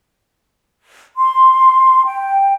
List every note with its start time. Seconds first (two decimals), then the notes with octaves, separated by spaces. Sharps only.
1.18 C6
2.05 G5